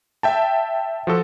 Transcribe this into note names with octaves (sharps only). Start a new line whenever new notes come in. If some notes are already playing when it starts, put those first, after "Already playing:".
E5 G5 A5
F3 F#4 A4